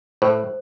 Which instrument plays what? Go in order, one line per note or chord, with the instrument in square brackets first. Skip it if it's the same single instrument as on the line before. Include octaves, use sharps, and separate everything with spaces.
[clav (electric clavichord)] A2 [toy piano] C5